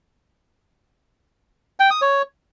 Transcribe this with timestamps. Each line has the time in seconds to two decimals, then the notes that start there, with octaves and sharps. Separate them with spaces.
1.80 G5
1.91 D#6
2.02 C#5